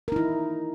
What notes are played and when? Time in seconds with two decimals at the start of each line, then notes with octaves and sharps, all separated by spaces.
0.08 A#4
0.12 D#4
0.16 E4